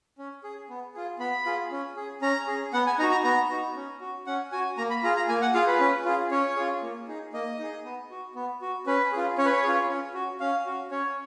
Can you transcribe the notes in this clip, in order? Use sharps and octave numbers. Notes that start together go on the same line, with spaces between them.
C#4
G#4
B3
F4 G#4
B3 B5
F4 G#4
C#4
G#4
C#4 A#5
G#4
B3 F#5
G#5
D#4 F#4 A#5
A#5
B3 A#5
D#4 F#4
C#4
F#4
C#4 F#5
F#4 G#5
A#3 A#5
B5
F4 G#4 A#5
A#5
A#3 G#5
F#5
F4 G#4 F5
B4
C#4
F4 G#4
C#4 C#5
F4 G#4
A#3
D#4 G#4
A#3 D#5
D#4 G#4
B3
F#4
B3
F#4
C#4 B4
F4 G#4
C#4 C#5
B4
C#5
F4 G#4
C#4
F#4
C#4 F5
F#4
C#4 C#5